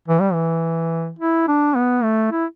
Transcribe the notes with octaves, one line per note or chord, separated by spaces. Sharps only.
E3
G3
E3
E4
D4
B3
A3
E4